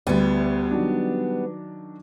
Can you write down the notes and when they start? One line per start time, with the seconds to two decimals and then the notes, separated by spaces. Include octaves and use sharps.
0.07 D2 G3 B3
0.71 D#3 F#3 D4